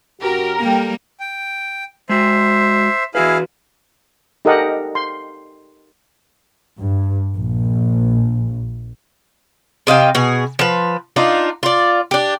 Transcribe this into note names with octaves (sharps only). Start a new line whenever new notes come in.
F#2 F#4 G4 A#4
G3 A#3 A4 G5
G5
G#3 F#4 C5 E5
E3 E4 F#4 G#4 B4 F5
D#4 G4 A4 A#4 D#5 F#5
C6
G2
A#1
C3 D#5 F5 G5
B2 G#4
F3 B4
D4 D#4 F4
F4 D5
D4 G4